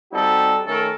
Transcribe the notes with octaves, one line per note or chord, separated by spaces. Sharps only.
G3 C4 D#4 F#4 A4
D#3 A3 C#4 A4 A#4